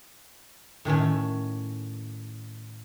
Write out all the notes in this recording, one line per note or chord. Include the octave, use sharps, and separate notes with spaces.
A2 D#3 A3 C#4